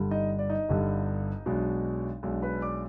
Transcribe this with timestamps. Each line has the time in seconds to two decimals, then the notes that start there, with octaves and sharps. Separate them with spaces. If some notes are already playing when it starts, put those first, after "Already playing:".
Already playing: G1 G2 D3 G3
0.11 D#4 D#5
0.39 D5
0.50 D#4 D#5
0.69 G1 G2 D3 G3
1.46 B1 B2 G#3 D4
2.23 B1 B2 G#3 D4
2.42 B4 B5
2.62 D5 D6